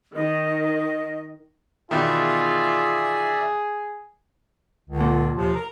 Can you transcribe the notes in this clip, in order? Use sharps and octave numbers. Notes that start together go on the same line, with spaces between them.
D#3 D#5
E2 B2 D#3 F4 G#4 D5 E5
C#2 D3
A#2
D#2 C3 F3
A#4